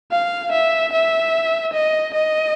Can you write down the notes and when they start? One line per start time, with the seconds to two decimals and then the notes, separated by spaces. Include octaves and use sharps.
0.12 F5
0.52 E5
0.93 E5
1.73 D#5
2.14 D#5